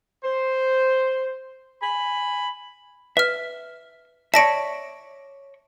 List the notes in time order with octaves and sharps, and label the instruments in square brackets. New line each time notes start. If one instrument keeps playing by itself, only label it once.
[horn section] C5
G#5 B5
[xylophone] B4 F6 [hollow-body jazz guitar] E5
[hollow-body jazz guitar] C#5 D5 E5 [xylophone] A5 A#6 D7